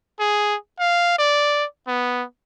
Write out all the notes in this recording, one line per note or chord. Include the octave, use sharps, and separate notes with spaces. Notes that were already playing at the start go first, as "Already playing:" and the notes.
G#4
F5
D5
B3